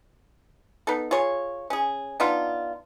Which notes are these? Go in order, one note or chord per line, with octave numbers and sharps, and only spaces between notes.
B3 D#4 A4
F4 G#4 C#5
C#4 G#4
B3 D4 D#4 F4